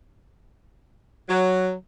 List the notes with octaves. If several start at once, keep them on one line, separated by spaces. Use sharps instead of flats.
F#3